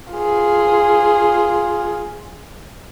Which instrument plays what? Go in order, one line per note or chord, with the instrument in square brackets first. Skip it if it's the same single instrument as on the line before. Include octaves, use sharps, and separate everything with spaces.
[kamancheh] F4 G#4